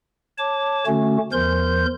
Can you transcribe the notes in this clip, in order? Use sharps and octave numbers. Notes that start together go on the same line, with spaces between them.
C#5 A5 D6
D3 A3 C#4 F#4
E2 F3 A#4 C5 C6 G6